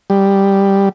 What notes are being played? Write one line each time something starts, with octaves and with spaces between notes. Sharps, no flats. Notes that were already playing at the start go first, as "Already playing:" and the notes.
G3